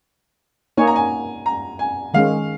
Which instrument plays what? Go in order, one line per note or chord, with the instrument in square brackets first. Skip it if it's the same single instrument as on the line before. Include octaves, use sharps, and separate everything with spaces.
[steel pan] A#3 D#4 C#5 [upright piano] G#5
[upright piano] A#5
G#5
A#5
G#5
[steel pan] D#3 G#3 C#4 [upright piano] F5